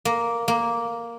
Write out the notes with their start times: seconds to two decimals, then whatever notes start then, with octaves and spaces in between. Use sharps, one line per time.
0.05 A#3
0.48 A#3